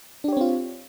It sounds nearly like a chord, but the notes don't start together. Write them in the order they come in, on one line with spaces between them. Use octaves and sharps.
D4 G4 C#5 C4 F4